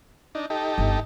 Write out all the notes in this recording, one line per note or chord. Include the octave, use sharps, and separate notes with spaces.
D4 D#4
D#4 G4 A4
G1